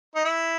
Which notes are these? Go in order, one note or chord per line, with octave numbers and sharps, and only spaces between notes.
D#4
E4